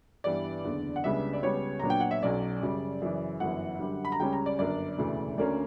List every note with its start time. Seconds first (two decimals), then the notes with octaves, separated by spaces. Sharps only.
0.24 G2 E3 G3 B3 D5
0.64 F#1 E2 D3
0.96 F#5
1.04 C#2 C#3 G3 B3 D4 E5
1.33 D5
1.43 C#2 C#3 G3 B3 C#5
1.80 A#1 A#2 F#3 B3 D4 A#5
1.90 G5
2.00 F#5
2.11 E5
2.22 B1 B2 F#3 C#4 D5
2.62 F#2 C#3 G3
3.02 F#2 C#3 E3
3.40 G1 F#2 E3 F#5
3.80 F#2 D3 G3
4.05 B5
4.12 A#5
4.19 C#2 C#3 G3 C#4 G5
4.33 A#5
4.46 D5
4.59 G1 F#2 D3 A#3 D4 D5
4.98 E1 D2 C#3 E3
5.37 D2 D3 A#3 C#4 D5